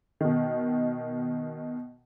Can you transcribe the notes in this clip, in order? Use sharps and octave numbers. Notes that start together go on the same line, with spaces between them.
B2 D#3